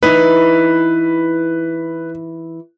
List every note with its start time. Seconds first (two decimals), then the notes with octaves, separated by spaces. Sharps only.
0.03 E3 D#4 E4 B4